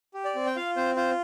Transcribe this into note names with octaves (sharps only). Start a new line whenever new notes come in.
G4
D5
C4
G5
F4 F5
C4 C5
F4 C5